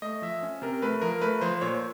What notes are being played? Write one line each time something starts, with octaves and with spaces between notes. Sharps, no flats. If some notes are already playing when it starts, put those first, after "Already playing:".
A3 D#5
F3 E5
C#4
C3 A#4
A3 B4
F3 A#4
A3 B4
F3 C5
A#2 C#5